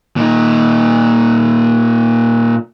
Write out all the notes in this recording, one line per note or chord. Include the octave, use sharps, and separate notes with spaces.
A#2 D#4